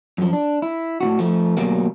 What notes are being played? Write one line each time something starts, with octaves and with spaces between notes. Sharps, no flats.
F#2 F3
D4
E4
A2 C#3 F#4
F3 A3
D2 B2 F#3 G3 A#3